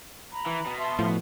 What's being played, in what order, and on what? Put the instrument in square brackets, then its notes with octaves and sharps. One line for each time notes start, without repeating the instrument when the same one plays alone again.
[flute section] A#5 B5
[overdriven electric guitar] E3
B2
[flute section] E5 A5 C6
[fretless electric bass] A2 [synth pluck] F3